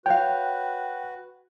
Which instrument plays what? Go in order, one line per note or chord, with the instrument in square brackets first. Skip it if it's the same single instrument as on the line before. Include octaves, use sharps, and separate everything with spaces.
[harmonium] F#4 B4 [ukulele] C#5 F5 [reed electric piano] G5